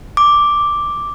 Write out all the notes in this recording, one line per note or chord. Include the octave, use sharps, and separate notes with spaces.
D6